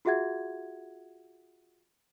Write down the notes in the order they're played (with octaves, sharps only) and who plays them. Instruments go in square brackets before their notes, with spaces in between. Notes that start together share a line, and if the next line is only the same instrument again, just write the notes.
[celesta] F4 F#4 G#4 E5 F#5 G#6